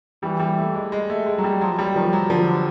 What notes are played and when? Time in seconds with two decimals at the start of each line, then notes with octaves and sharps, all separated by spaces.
0.23 E3 G3
0.40 G3
0.58 A3
0.74 G#3
0.92 G#3
1.10 A3
1.26 G#3
1.38 F#3
1.44 G3
1.61 F3 F#3
1.79 G3
1.95 D#3 F3
2.13 F#3
2.30 D3 F3